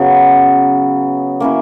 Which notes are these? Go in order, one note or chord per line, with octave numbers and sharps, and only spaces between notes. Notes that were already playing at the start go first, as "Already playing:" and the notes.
Already playing: C#3 F#3 B3
A#3 C#4 E4